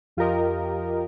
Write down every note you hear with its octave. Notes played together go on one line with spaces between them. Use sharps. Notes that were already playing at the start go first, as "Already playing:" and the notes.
F2 F4 G4 A#4 D#5